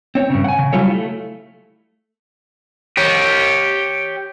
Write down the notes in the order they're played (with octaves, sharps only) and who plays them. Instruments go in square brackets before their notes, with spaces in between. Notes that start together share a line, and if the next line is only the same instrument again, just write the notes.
[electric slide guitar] C4 C#5
G2 C#3
F#5 G#5
C#3
F#3 G3 E4 F4 A4 C#5
A3
[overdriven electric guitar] G4 C#5